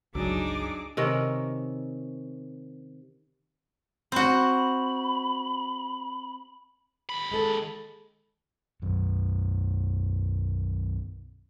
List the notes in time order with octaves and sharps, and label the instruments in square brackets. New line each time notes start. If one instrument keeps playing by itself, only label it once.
[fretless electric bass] G1 C#2 [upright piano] F#3 [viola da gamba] D4 D#4 [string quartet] G#4 D6
[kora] C3 D#3 C#4 A#4
[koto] C4 F#4 [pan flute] B5
[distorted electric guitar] D#2 B5
[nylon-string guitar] G#3 A4
[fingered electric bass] B1 F#2